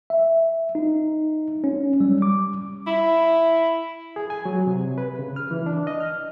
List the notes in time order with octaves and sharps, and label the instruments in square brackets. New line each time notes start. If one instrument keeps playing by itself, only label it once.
[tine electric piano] E5
D#4
C#4
G3
D6
[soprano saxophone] E4
[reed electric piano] G#4
G#5
F#3
C3
B4
C#3
F6
E3
D4
D#5
F6